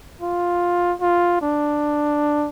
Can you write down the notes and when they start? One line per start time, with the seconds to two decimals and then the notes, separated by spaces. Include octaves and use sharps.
0.21 F4
1.01 F4
1.42 D4